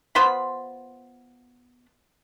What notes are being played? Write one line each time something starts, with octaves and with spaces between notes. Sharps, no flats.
B3 F4 C5 B5